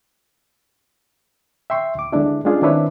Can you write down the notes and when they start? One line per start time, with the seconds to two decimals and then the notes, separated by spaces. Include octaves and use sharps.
1.70 E5 G5 C6 C#6
1.95 D2 D6
2.12 D3 G#3 B3 D4 E4
2.45 G#3 C#4 D4 F4 G#4
2.62 D#3 C4 D4 E4 B4 C#5